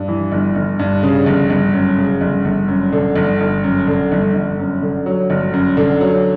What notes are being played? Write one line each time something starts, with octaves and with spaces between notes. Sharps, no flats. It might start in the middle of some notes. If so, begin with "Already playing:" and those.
Already playing: G2
E3
G1
G1
G2
C#3
G1
G1
F#2
C#3
G1
G1
F#2
D3
G1
G1
F#2
D3
G1
G1
F#2
D3
F#3
G1
F#2
D3
F#3